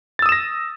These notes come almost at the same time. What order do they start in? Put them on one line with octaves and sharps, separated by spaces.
A6 E6 D#6 E7 A#6